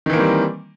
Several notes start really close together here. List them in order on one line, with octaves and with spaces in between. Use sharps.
D#3 E3 A#3 C4 G3